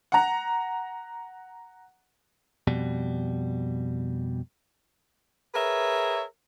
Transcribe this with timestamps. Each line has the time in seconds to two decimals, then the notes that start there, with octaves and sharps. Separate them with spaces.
0.12 F#5 A#5
2.68 F2 B2 G3
5.54 G#4 A#4 B4 C#5 E5